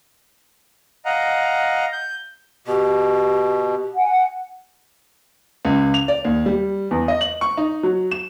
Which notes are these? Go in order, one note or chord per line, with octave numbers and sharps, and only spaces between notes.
D#5 F5 F#5 A#5
G6
B2 G4
F#5 G#5
C#2
F7
D5
D#2
G3
E2
D#5
F#7
C#6
D#4
F#3
E7